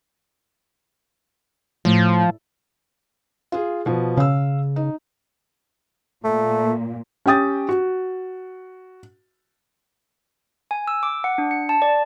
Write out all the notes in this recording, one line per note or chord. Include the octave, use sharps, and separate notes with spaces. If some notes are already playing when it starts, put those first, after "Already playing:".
A2 F3
F4 G#4
B2 F3
C#3 F5 E6
D#4
A#2 A3
C#4 G4 G5 D#6 A6
F#4
G#5
E6
D6
F#5
D4
C#7
A5
D5